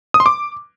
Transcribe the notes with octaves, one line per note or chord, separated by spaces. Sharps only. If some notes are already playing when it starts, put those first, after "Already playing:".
D#6
C6
D6